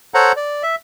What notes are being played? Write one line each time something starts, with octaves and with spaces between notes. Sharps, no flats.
A4 C5 C#5 F#5 A#5
D5
E5